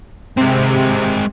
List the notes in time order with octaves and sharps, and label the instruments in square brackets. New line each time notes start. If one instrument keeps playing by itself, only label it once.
[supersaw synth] C3 [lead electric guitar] G#3 C4